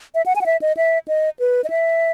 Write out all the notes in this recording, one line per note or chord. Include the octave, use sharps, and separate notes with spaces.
E5
F#5
G#5
F#5
E5
D#5
E5
D#5
B4
D#5
E5